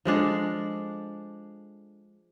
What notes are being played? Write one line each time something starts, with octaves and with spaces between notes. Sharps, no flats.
F3 G#3 D4 A4